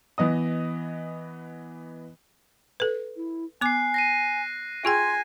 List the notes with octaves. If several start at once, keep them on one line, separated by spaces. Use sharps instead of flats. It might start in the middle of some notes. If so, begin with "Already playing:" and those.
E3 B3 D#5 D#6
A4 B4
E4
B3 G#5 D6 F#6 C7
A#6 C7 D#7
F4 G#4 G5 G#5 C6